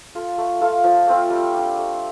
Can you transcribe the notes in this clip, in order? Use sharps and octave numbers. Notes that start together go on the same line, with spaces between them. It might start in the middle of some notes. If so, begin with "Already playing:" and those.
F4 A4
A3
F4 A4 F5
F3
A3 C4 F4
G3
D4 G4
A3